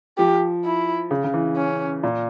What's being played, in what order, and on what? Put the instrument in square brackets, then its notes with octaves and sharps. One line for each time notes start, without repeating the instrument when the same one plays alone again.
[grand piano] F3 [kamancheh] G4
[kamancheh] E4
[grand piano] C#3
C#3
E3
[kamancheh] C#4
[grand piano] A#2